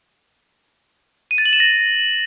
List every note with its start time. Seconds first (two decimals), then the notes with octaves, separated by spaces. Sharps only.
1.31 D#7
1.38 A6
1.45 F#7
1.53 E7
1.60 A#6